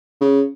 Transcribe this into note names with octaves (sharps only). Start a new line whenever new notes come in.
C#3